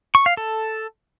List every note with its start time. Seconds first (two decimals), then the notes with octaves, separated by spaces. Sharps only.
0.15 C#6
0.26 F5
0.37 A4